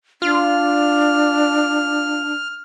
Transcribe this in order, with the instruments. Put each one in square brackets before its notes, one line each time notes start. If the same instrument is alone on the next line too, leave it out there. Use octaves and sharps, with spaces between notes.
[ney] D4 [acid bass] F4 [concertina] F6